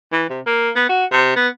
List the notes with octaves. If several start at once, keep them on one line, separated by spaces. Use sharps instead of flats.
E3
C3
A#3
B3
F#4
C3
B3